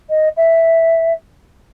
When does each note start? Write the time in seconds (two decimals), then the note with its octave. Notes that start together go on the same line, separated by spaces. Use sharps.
0.09 D#5
0.37 E5